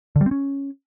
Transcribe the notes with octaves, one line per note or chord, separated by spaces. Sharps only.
D3
G3
C4
C#4